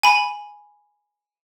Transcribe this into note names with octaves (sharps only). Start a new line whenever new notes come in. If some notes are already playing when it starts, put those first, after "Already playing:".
G#5 B5